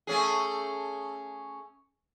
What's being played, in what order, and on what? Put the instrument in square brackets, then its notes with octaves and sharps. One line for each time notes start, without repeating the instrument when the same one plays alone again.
[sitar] A3 C#4 G#4